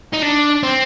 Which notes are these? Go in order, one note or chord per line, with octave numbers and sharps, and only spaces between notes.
D#4
D4
C4